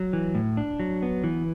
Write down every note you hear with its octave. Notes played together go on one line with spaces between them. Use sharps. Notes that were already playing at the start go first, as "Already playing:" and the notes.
Already playing: F#3
E3
A2
D4
F#3
B3
E3